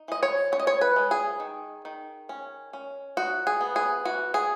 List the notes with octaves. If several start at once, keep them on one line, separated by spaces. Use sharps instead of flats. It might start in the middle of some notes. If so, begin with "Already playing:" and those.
Already playing: D#4
E3 D#5
C#5
C#4 C#5
D#5
C#5
B4
G#3
G#4
D#3
D#3
C#4
C#4
D#4 F#4
G#4
B3
G#4
E3 F#4
G#4